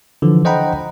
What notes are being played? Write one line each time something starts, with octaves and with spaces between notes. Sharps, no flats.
D3 E3 F3
C5 D#5 F#5 G5 A#5 B5